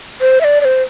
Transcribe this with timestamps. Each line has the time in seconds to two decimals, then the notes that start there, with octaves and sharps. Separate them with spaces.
0.21 C5
0.41 E5
0.44 D5
0.61 D5
0.65 C5